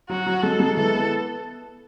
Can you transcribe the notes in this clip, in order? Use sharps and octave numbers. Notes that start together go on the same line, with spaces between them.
F#3 F#4
F#3
G#3 A4
G#3
E3 A4
B3